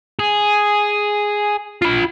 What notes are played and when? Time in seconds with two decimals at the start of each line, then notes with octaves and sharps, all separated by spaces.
0.19 G#4
1.82 F4 B5